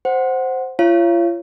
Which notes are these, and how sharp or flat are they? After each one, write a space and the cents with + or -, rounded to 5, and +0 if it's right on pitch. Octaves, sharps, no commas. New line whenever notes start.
C5 +0 F#5 +0
F4 -35 C#5 +0 F5 -40